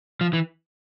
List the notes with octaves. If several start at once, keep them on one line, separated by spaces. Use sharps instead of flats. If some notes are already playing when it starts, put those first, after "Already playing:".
F3
E3